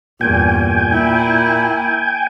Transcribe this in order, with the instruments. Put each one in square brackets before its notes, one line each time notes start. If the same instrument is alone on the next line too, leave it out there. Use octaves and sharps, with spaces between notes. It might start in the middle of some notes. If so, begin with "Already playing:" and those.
[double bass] E2 G2 [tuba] A#2 [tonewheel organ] G5 G#5
[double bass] A#3 E4